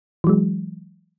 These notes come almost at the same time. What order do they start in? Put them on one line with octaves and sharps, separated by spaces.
E3 F#3 G#3